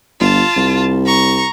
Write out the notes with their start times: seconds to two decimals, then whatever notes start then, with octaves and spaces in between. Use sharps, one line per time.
0.20 G1 F4 A5
0.57 C2
1.05 A#5 C#6